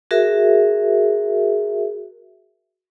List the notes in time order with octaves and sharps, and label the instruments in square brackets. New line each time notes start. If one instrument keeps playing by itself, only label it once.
[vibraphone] F#4 G#4 A#4 E5